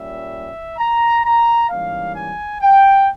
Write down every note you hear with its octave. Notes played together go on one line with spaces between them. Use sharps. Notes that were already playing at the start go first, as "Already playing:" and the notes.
Already playing: A#2 G3 C#4 E5
A#5
A#5
G#2 E3 G3 A#3 C#4 F5
G#5
G5